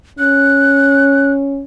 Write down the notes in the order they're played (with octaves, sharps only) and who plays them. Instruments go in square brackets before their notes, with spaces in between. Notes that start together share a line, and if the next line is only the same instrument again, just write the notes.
[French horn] C#4 [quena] F#6